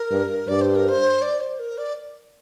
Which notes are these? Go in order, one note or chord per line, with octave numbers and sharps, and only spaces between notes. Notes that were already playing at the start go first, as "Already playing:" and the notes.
Already playing: A#4
G2
G2 D5
C5
A#4
C5
D5
C5
A#4
D5